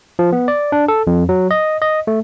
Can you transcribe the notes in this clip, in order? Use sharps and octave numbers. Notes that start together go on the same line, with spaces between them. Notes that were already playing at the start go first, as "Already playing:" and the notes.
F3
B3
D5
D4
A4
F2
F#3
D#5
D#5
A3